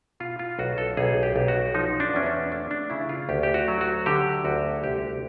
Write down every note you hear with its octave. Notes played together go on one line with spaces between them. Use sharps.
B2 F4
F4
B1 F#4
A4
B1 G#4
G4
B1
F#4
F3 D#4
D4
E2 C#4
D4
A3 D4
D4
C#3 E4
F4
D2 G4
G4
F#4
F#3
F#4
D3 G4
D2 F#4
G#4
C2 G4
G4